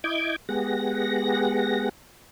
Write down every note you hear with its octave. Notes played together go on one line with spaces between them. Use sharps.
E4 D#5 D6 G6 G#6
G#3 B3 G4 G#4 F#5 A#6